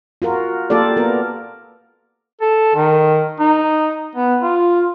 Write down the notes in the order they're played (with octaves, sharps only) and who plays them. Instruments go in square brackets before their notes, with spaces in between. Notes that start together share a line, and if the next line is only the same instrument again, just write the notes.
[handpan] F4 F#4 A#4
A#3 F4 G4 A4 D5
B3 A#4
[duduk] A4
D#3
D#4
B3
F4